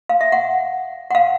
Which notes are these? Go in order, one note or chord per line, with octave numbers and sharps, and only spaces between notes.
F5
E5
F#5
F#5
F5